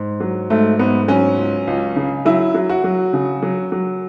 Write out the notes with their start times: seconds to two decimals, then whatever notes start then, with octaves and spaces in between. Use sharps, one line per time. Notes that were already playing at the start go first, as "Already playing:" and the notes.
Already playing: G#2
0.20 F#3
0.50 G#2 A3
0.79 G#2 B3
1.08 F#3 C#4
1.38 C#2
1.67 C#2
1.96 C#3
2.25 F#3 E4
2.54 F#3
2.69 F#4
2.84 F#3
3.13 C#3
3.43 F#3
3.72 F#3